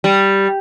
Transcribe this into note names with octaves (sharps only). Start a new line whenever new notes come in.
G3